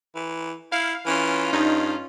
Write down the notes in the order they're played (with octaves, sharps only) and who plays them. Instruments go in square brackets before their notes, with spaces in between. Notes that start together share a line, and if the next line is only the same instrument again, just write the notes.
[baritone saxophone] E3
[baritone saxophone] E4 [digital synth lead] F5
[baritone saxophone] E3 [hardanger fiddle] C#4 F4
[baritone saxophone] G2 [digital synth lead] D#4